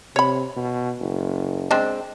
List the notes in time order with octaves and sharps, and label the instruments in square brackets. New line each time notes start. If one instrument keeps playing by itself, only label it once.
[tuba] C3 [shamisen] C#5 B5
[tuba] B2
F#1
[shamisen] G#3 C4 D4